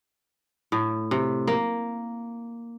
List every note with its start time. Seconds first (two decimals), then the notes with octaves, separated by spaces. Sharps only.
0.72 A2
1.11 C3
1.47 A#3